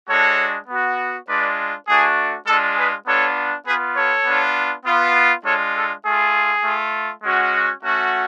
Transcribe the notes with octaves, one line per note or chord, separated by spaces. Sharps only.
G#3 D4 F#4 A4 C#5
B3 F#4
G#3 D4 F4 B4 D5
A3 D4 F#4 G#4
G#3 D4 F4 A4
G#4 B4
B3 D4 F4 A4 C#5
B3 F4 G#4 B4
A4 C#5
B3 D4 F4
B3 F4
G#3 D4 F4 A4 C#5
A4
A3 F4 G#4
A3 F4
G#3 C#4 F#4
A3 C#4 F#4